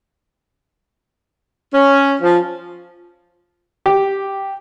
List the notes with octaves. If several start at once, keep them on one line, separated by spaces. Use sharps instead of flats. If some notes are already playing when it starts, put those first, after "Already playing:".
C#4
F3
G4